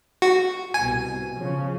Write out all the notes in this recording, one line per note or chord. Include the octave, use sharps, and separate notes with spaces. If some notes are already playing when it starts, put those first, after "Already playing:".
F#4
C2 B2 G#5
C#3 F3 C#4